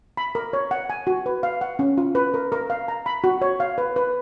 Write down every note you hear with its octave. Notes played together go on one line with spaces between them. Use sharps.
B5
A#4
C#5
F#5
G#5
F#4
B4
F5
F#5
C#4
F4
B4
A#4
A#4
F5
A#5
B5
F#4
C#5
F5
B4
B4